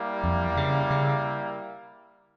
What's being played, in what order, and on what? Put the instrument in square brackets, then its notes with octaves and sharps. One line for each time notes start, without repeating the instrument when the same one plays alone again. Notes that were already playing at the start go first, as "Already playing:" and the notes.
Already playing: [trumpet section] G3 A#3 E4
[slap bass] F2
C#3
C#3